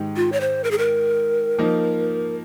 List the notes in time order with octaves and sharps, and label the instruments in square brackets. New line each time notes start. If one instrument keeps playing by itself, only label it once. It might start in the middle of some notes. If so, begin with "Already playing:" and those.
Already playing: [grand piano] G#2 D#3 G#3 D#4 G4
[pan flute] F4
C#5
C5
A#4
G#4
A#4
[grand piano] F3 A#3 D#4